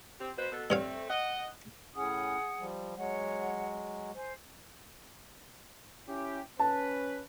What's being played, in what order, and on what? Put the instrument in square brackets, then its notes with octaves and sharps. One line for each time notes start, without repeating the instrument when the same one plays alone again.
[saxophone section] C4 G4
B2 B4 C5
B2 B3 A4
[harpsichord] G2 C#5 F5 [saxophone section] A3 C4
[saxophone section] D#5 F#5
[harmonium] A2 C#4 [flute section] G#4 F#5 D#6
[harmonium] F3 G3
[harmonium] F#3 G#3 [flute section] C#5 F#5
[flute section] C5 G#5
[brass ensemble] C#4 E4 G4
[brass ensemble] C#4 B4 [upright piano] A5